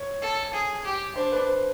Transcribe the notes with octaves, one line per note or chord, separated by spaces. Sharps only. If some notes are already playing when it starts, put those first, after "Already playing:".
Already playing: C#5
A4
G#4
G4
D4 C5
B4
C5